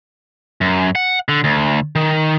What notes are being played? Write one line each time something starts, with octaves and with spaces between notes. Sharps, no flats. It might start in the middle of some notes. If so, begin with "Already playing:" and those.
F#2
F#5
D3
D2
D#3